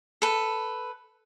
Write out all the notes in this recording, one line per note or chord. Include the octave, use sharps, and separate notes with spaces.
A4 B4